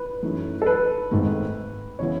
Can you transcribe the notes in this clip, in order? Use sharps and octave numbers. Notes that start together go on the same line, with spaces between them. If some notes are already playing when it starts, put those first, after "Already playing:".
Already playing: B4
F#2 E3 A3 D#4
A4
B4
G#1 G#2 D#3 A3
C#3 E3 B3 E4 C#5